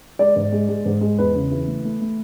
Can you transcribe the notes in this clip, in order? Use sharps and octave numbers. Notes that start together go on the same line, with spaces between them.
G#3 D5
G#2
G#3
G#3
G#2
G#3
E2 B4
C#3
E3
A3
A3
A3